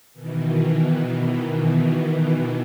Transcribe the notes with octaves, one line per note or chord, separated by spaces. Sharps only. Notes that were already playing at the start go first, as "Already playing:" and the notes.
B2 D#3 E3